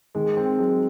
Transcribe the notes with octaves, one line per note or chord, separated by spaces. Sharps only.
D#3 G#3
C4
F#3 G#3